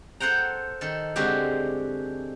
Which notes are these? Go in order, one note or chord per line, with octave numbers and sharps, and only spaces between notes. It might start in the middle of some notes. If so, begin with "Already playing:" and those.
A4 C5 F#5 G5 A#5
D#3 A4
D3 G#3 C4 F#4 G4